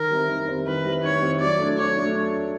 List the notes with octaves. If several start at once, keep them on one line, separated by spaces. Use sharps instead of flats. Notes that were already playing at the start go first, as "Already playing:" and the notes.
Already playing: D#3 A#4
G3 C4 E4
D#3
G3 C4 E4
D#3 B4
G3 C4 E4
D#3 C#5
G3 C4 E4
F#3 D5
A3 D4
F#3 C#5
A3 D4